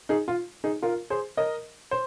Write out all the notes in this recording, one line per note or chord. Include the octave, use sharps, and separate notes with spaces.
D#4 G#4
F4
D#4 G#4
F4 A#4
G#4 C5
A#4 D#5
C5